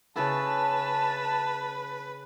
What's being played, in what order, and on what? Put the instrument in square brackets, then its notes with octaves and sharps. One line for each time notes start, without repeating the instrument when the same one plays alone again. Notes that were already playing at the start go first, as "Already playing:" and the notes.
[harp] C#3 E4 [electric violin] B4 [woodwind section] A5